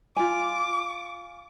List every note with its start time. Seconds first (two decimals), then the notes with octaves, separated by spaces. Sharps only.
0.16 F4 G#5 D6